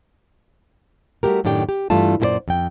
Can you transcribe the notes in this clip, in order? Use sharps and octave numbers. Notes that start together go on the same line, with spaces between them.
G3 A3 B3 F#4 G4 A#4
F#2 A2 D#3 D4 G4 G5
G4
G2 E3 G3 A3 F4 A5
F#2 A#2 E4 A4 C5 D5
F2 G5